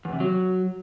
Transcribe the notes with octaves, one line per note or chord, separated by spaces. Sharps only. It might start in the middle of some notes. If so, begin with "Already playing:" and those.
E2
C3
F#3